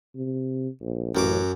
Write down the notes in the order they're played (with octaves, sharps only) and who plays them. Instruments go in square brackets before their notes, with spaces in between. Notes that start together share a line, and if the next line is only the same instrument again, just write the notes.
[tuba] C3
A#1
[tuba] A1 [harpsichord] F#2 F#3 D6